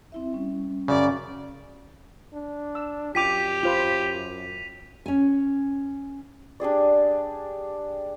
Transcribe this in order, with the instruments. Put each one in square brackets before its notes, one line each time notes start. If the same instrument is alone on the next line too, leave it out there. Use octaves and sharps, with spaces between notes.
[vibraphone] C4 E4 E5
G3 C#4
[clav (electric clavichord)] F#2 C#3 [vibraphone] C#4 [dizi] D5
[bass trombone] D4
[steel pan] E6
[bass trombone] F#2 [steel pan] F4 G5 D6 [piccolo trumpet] G4 [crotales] B6 D#7 F7
[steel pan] F4 C5 B5 [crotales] F7
[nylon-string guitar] C#4 G#5
[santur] D4 G4 G#4 D5